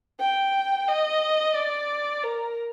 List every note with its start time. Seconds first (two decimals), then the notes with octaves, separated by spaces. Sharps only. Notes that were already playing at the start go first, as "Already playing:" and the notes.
0.19 G5
0.87 D#5
1.55 D5
2.23 A#4